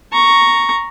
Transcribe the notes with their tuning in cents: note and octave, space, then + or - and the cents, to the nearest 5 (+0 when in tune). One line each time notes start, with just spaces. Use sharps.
A#5 +0 C#6 +0